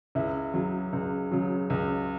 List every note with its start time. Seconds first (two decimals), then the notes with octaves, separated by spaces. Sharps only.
0.15 C#2 E4
0.54 C#3 F#3
0.93 C#2
1.31 C#3 F#3
1.70 C#2